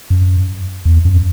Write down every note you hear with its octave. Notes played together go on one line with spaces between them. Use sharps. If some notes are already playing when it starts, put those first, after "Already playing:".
F#2
E2
F#2